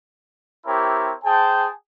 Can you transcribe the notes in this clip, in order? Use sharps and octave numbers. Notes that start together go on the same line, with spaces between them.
C4 E4 G4 A#4 C#5
G#4 C5 G5 A5